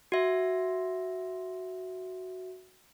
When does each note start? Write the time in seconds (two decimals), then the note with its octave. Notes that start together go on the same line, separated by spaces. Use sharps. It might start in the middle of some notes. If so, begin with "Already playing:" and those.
0.12 F#4 E5